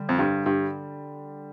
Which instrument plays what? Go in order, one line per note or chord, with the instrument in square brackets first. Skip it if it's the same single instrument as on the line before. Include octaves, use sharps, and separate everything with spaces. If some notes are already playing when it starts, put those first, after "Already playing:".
Already playing: [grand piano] D3 G3
[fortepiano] F2
G2
G2